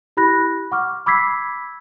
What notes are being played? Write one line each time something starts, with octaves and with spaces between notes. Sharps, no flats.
E4 G4 B5 F#6 A#6
F#5 C#6 D6 F6
B5 D6 E6 G#6 B6 C7